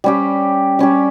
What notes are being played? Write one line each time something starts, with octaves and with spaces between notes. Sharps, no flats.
G3 C#4 G4
G3 C#4 G4